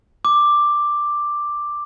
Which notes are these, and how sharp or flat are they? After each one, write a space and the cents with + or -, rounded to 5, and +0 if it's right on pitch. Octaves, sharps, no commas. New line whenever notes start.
D6 +5